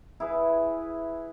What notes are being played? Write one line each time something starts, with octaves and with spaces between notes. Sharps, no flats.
E4 G#4 B4